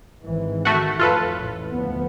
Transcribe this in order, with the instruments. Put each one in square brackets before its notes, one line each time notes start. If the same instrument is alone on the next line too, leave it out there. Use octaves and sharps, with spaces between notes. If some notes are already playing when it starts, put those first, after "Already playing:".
[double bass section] G#1 G#2 E3
[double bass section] D#3 [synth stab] A3 F#4
[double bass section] F2 A2 [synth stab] F4 A4 B4
[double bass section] A1 E3
D2 F3 B3